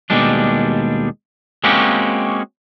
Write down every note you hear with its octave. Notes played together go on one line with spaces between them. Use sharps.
D#2 B2 G3 G#3 D4
G#3 A#3 C4 C#4 F#4 G4